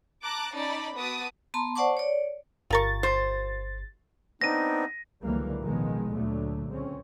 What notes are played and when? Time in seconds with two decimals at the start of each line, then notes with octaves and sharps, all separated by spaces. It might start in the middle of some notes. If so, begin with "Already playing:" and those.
0.22 A5 A#5 D6 F#6
0.54 C#4 D#4 D5 A5 B5
0.96 B3 F#4 B4 A5 D6 D#6
1.54 B3 A5 A#5 C6
1.75 C5 D5 F#5 A5 C#6 D6
1.97 C#5 D5
2.70 G1 F4 A#4 C#6 A6
3.03 C5
4.41 B3 C4 D4 D#4 A#6 D#7
5.23 C#2 D3 E3 F#3 G3 A#3
5.62 A1 B2 D#3 F3 G#3 B3
6.14 D2 A#2 D3 F#3 A3
6.69 C#2 C4 C#4